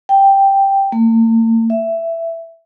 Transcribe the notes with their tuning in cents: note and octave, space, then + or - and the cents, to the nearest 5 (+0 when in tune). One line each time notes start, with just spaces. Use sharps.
G5 +0
A#3 -45
E5 +10